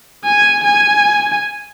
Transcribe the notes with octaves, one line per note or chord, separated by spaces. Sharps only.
G#5
G#5